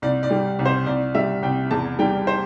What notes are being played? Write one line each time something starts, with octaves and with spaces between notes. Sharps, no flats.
C2 D5
D5
G3
C2
C5
C2 D5
G3 E5
C2 G5
E2 A5
G3 G5
C5